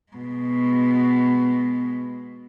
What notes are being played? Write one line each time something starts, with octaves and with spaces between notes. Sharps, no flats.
B2 G#3